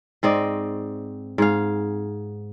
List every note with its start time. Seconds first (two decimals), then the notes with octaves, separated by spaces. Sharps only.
0.23 G#2 C4 D5 D#5
1.38 G#2 G#4 F5